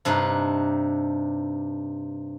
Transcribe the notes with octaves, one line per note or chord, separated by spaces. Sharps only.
G2 C3 D4 D#4